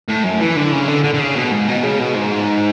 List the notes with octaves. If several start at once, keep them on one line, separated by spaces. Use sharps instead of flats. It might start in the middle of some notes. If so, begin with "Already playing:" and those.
A2
F#2
E3
D3
C#3
D3
D3
D3
C#3
B2
G#2
B2
C#3
B2
G#2